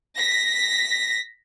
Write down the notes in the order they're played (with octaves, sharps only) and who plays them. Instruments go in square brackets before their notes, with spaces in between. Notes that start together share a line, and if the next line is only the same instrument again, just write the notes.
[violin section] A#6 B6